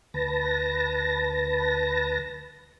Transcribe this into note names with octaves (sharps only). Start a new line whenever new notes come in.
D2 B4 A5 A#6